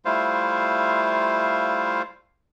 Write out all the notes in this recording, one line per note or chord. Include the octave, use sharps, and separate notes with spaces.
G3 A3 E4 F4 C5 F5